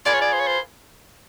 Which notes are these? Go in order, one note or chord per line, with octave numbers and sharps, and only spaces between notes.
F4 G#4 B4 D5
C#5
D5
C5
C#5
C5